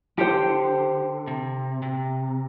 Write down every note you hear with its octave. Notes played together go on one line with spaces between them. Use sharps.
D3 G4 C5 G5
C3
C3